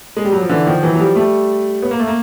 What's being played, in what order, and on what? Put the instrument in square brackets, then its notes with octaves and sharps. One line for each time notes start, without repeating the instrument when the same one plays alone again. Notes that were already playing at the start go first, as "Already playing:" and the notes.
[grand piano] G#3
G3
F#3
F3
D3 E3
D#3 F3
E3 F#3
F#3
F3 G3
G3 A3
B3
A#3
A3
A#3